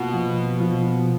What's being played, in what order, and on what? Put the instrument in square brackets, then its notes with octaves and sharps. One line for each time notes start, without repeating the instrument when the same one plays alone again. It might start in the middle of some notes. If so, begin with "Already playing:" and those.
Already playing: [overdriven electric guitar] B2 [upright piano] A#3 F4
[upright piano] F3
F3